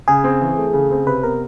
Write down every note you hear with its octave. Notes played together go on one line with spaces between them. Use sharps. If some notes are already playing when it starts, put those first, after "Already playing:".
C#3 G#4
C4
E3
A3
C#3
C4
C3 B4
B3 A#4